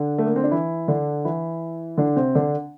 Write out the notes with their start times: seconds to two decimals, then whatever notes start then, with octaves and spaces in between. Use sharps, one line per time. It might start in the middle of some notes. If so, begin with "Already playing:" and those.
Already playing: D3 D4
0.18 A3
0.26 A#3
0.36 C4
0.44 D4
0.51 E3 E4
0.88 D3 D4
1.25 E3 E4
1.97 D3 D4
2.16 C3 C4
2.35 D3 D4